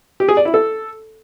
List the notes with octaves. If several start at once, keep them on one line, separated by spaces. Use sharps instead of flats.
G4
G#4
D5
E4
A4